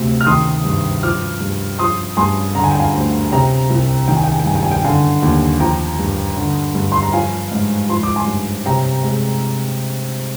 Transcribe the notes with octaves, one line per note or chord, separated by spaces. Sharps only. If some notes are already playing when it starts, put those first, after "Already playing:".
Already playing: D2 C3
F6
D#3 C6 D#6
G2
F3 D6 F6
G2
F3 C6 D#6
G2 G#5 C6
D3 A#5
G#5
G5
F5 G#5
D2
C3 G5 A#5
C2
D#3 G5
G#5
G5
G#5
G5
G2 G#5
G5
G#5
G5
D3 F5 G#5
D#2
F3 G5 A#5
G2
D3
G2
C6
A#5
F3 F5 G#5
G#2
F3 C6
D6
G#5 C6
G2
C3 G5 A#5
G#3